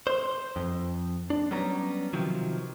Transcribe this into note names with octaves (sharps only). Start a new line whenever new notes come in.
C5
F2
D4
F#3 G3 B3 C#4 A#5
C3 D#3 F3 F#3